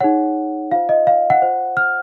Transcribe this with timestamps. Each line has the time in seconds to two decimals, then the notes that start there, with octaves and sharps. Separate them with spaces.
0.01 D#4 G#4 C#5 F#5
0.71 F4 C5 F5
0.89 D#5
1.07 F5
1.30 F#5
1.42 F4 C5
1.77 F6